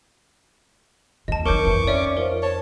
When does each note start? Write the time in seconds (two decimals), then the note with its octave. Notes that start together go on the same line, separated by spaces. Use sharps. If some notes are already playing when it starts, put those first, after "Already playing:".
1.28 D#2 G#3 D#5 A5
1.46 C#4 D#4 A#4 C#5 C#6 D6 G6
1.65 F2 E3 D#4 C#7
1.87 C#4 D5 E5 D7
2.17 F3 A#4
2.43 C#5 A5